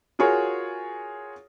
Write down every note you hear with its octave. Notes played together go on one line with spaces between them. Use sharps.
F4 F#4 G#4 A#4 C#5